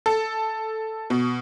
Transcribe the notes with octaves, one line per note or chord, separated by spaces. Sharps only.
A4
B2